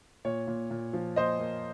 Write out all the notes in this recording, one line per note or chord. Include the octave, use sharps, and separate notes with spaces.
A#2 C#5
A#2
A#2
F3
A#2 C5 D#5
A#3